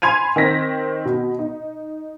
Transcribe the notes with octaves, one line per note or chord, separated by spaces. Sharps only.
G#5 B5 C6 G#6 D#7 F7
D#3 C4 A#6 B6
B2
D#4